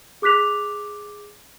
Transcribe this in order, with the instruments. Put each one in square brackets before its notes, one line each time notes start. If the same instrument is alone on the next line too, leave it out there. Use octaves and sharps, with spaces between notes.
[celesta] G#4 D6 F#6 B6 F7